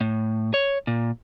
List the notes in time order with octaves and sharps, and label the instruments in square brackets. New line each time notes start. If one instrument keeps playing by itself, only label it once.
[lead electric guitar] A2
C#5
A#2